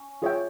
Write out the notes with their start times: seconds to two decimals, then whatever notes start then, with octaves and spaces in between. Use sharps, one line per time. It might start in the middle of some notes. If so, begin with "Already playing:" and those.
Already playing: C#4
0.22 F4 G#4 C#5 E5 G5